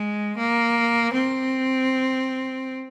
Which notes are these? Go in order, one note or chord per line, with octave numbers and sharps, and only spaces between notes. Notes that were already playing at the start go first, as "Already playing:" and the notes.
Already playing: G#3
A#3
C4